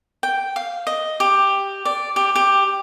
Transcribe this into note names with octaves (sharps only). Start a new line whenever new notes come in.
G5
F5
D#5
G4
D5
G4
G4